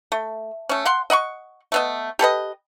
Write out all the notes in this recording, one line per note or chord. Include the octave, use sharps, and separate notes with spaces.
A3
A3 C#4
F5 F#5 C6
D#5 F#5 B5 C#6
A3 B3 D#5
G4 A4 B4 D#5